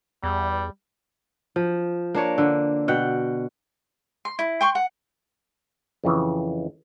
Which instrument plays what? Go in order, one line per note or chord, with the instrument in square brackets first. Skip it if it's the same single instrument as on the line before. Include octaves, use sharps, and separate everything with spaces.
[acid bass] E2 [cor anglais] G3
[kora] F3
A#3 D4 C#5
D3
B2 F#5 G5
[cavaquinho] C6
E4
G5 C6 C#6
F#5
[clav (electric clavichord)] F2 C#3 E3